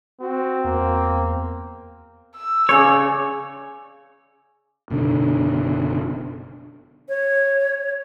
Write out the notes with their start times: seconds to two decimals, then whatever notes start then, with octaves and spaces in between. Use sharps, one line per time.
0.21 C4 F#4
0.64 E2 A#3
2.36 E6
2.69 C#3 C#5 D5
4.90 F#1 B2 D3 D4
7.09 C#5